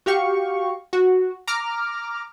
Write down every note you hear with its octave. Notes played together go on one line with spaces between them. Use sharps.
F#4 G4 F5 C#6
F#4
A#5 D6 F6